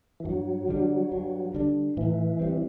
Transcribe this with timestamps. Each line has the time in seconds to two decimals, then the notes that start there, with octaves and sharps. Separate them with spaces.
0.20 E3
0.25 G2 F#3
0.68 D3 G3 D4
1.12 G2
1.54 D3 G3 D4
1.97 A2 E3
2.40 G3 C4